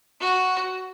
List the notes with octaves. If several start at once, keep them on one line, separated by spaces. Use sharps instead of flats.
F#4